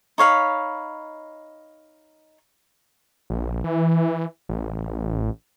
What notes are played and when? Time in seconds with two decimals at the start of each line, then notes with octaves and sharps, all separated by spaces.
0.18 D#4 C#5 F5 B5
3.30 A#1
3.64 E3
4.49 A1